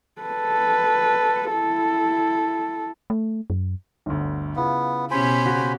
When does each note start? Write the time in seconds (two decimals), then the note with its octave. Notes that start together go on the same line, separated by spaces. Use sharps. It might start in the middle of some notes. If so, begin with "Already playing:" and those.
0.21 A4 B4
1.50 E4 A4
3.10 A3
3.50 F#2
4.06 G1 D2
4.56 C#3 B3 E4 F4
5.11 B2 C#4 G4 C5 G#5 B5
5.45 C#3 F#4